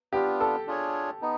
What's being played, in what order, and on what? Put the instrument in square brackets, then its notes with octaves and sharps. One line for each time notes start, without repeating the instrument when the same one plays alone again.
[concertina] B3 D4 F4 [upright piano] G4
[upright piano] A4
[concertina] D4 F4 G#4 C#5
B3 D#4